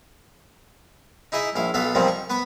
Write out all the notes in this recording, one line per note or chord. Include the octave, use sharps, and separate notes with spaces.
D#4 E4 G#4 D#5 E5
A#1 E4 F5
B1 F#3 B3 A4 F5 B5
A#2 D#3 F3 G3 A#3 C4
C#6
B3 B4 B5 C#6